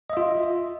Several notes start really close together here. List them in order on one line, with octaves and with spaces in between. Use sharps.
D#5 E5 F4